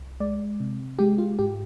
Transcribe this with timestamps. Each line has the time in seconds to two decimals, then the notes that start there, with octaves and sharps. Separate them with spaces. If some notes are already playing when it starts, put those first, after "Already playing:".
Already playing: C2
0.20 G#3 D5
0.60 C3
0.99 G#3 G4
1.18 F4
1.39 G#2 G4